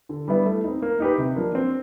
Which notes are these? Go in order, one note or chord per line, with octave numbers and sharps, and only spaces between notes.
D3
G3 B3 E4
A3
C4 D#4
A#3
D#4 G4 B4
C3
F3 A#3 D4
C4